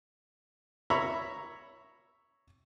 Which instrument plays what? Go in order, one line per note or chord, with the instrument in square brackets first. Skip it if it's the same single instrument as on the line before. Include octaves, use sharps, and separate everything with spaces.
[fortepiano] C#5 E5 A#5 B5